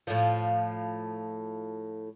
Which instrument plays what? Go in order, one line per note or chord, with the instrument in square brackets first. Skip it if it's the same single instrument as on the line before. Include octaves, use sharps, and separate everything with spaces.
[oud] A2 F3